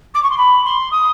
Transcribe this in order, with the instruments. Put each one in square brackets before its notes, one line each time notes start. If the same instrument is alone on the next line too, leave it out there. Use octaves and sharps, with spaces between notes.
[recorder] D6
C#6
C6
B5
C6
D#6